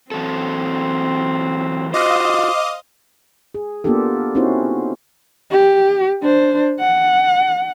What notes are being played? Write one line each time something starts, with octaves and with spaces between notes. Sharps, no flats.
E3 F#3 C4 A4
F4 F#4 C5 D#5 F5 D6 D#6
G#4
A#3 B3 D4 F4 G4 A4
C4 C#4 D#4 E4 F#4 C5
G4
D4 C5
F#5